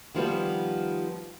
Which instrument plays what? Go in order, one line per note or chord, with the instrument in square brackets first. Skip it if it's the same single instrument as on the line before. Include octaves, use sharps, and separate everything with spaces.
[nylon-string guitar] D#3 F3 G3 B3